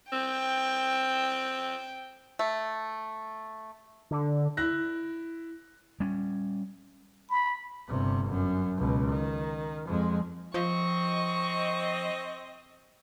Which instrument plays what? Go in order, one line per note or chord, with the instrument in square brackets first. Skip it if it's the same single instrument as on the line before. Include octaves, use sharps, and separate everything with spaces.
[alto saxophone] C4 [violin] G5
[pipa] A3
[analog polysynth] D3
[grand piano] E4 F#6 A#6
[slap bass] G3 C#4
[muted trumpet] B5
[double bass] G1 C3
F#2
C#2 B2
D#3
F2 G#3
[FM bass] F3 [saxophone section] C4 D#5 [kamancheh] C#6